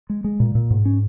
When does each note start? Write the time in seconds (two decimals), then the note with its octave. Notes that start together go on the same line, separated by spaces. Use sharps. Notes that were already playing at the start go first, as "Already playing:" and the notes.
0.10 G#3
0.24 G#3
0.40 A#2
0.55 A#2
0.70 G#2
0.85 C#4